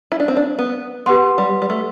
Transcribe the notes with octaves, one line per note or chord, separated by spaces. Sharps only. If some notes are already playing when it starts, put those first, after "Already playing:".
E4
D4
C4
D4
B3
B3 G4 B4 F#5 C6
G3
G3
A3